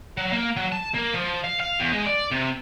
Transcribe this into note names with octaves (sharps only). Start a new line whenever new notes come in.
F#3
A#3
F#3
A5
A#3
F3
F5
F5
E2
G#3
D5
C3